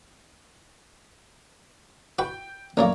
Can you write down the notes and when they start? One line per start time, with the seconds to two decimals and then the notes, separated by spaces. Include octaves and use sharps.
2.19 F#4 B4 G5
2.77 A1 F#2 A#3 A#4 C#5 D5